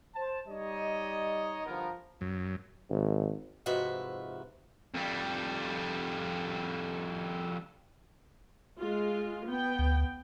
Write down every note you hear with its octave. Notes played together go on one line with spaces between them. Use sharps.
C5 A5
G3 D#4 C#5 D#5
G1 F3 B3 A#4
F#2
G#1
G#2 C3 F3 F#4 B4 E5
F2 G3
G#3 F4
B3 G5
D2